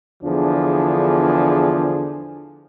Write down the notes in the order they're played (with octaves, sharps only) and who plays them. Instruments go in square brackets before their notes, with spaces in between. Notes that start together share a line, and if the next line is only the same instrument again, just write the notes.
[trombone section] E2 D3 F3 D4 G#4